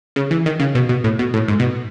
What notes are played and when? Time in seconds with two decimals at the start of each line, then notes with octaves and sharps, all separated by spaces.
0.16 C#3
0.31 E3
0.46 D#3
0.60 C#3
0.75 B2
0.89 B2
1.04 A2
1.19 B2
1.34 A2
1.48 G#2
1.60 B2